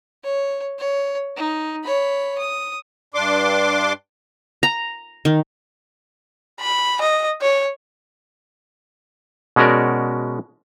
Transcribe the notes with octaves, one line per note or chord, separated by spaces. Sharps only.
C#5
C#5
D#4
C#5 B5
D#6
G2 D4 C6 D6
A#5
D#3
B5
D#5
C#5
B2 G#3 C#4 F#4 A#4 D5